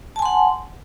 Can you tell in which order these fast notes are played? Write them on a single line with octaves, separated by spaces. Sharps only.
A5 G#5 C6 F#5